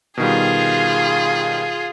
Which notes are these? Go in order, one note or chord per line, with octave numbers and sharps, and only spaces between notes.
B2 D#3 G3 F4 G#4